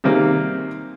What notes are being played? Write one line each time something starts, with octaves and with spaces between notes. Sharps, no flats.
C3 D#3 G3 A#3 C4 G#4